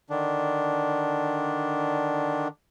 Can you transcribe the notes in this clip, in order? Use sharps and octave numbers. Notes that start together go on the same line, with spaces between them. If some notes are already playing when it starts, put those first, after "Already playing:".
D3 D#3 D4